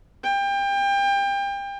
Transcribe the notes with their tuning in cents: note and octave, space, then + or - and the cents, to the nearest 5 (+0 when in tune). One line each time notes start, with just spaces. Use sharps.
G5 +30